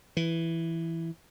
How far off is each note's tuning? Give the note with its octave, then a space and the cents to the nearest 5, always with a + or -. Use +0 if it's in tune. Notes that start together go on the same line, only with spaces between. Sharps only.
E3 +5